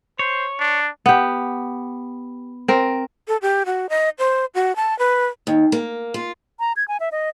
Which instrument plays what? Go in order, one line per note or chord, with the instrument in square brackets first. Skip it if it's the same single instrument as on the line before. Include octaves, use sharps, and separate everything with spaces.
[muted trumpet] C5 [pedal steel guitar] C#5
[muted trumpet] D4
[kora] B3 G4
C4 A#4
[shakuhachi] A4
G4
F#4
D#5
C5
F#4
A5
B4
[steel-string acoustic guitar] D#2
A#3
F4
[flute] A#5
G#6
G#5
E5
D#5